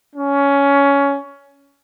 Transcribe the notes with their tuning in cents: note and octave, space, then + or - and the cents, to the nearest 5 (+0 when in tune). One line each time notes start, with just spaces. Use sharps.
C#4 +15